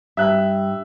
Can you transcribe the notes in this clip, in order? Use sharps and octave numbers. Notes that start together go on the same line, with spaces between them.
G2 E5 F#6